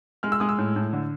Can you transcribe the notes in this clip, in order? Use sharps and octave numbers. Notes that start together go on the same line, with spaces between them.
G#3 F6
E6
G#3 D#6
E6
A2
A2
D3